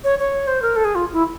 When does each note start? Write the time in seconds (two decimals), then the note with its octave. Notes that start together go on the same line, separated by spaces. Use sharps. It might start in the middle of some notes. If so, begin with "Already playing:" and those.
0.04 C#5
0.19 C#5
0.47 C5
0.62 A#4
0.76 A4
0.85 G#4
0.95 F4
1.13 E4